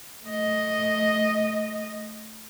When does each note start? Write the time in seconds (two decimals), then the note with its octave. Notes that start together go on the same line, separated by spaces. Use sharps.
0.24 A3 D#5